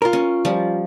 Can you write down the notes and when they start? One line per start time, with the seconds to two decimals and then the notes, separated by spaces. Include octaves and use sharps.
0.02 F4 A#4
0.13 C#4
0.45 F3 G3